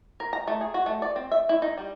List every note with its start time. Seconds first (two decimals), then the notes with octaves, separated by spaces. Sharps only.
0.20 A#4
0.33 A#5
0.47 A3
0.61 G#4
0.74 F#4
0.86 A3
1.02 D5
1.16 C4
1.31 E5
1.49 E4
1.62 D#4
1.78 G3